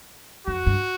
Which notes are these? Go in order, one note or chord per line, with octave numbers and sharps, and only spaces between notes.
F2 F#4
G2